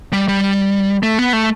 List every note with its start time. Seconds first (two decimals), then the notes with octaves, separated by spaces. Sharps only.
0.13 G3
0.28 G3
1.03 A3
1.19 B3
1.33 A3